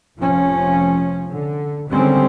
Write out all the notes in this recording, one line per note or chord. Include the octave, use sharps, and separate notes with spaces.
F1 F3 C#4
D3
D3 D#3 G3 G#3 C4 C#4